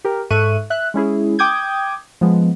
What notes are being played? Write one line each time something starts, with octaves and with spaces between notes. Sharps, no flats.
G4 A#4
G#2 A4 E5 C#6 F#6 D#7
E5 F#6
G#3 C#4 E4 G#4
G5 D6 D#6 G6 G#6
F3 G#3 B3